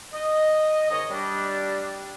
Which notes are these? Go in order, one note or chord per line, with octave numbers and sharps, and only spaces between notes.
D#5
G#2 D#3 C#5 D#5
G3 D4